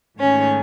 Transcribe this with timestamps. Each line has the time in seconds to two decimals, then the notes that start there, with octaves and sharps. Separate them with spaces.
0.18 G#2 D#3 A3 C#4 C#5